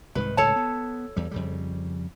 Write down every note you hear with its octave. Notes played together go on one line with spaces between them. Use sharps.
C2 G#2 D#3 B4
C#2 A2 A4 C#5 A5
B3
E2 G3
F2 C#3 G3